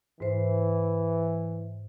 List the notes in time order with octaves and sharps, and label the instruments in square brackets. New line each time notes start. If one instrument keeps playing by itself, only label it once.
[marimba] G#2 C5 [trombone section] E3